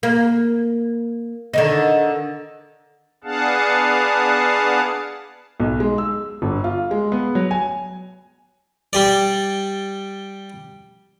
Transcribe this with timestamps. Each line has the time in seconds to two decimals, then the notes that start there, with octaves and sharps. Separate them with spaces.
0.03 A#3
1.53 D3 D#3 D#4
3.24 B3 D4 G#4 F5 F#5 A5
5.60 B1
5.80 G#3
5.98 E6
6.42 G1
6.64 F4
6.91 G#3
7.12 B3
7.35 F#3
7.51 G#5
8.93 G3 G4 D5